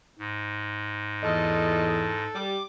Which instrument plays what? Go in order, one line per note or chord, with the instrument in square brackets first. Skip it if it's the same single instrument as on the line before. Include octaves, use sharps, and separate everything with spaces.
[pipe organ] G#2
[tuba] E2 [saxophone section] A3 F4 D#5 [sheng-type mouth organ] A4
[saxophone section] G3 [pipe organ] D6